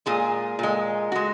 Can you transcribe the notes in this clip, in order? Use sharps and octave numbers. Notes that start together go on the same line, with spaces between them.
A#2 G#3 G#4
A#2 G#3
G#3 F#4